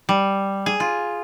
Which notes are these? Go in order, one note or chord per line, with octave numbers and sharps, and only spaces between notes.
G3
G#4
F4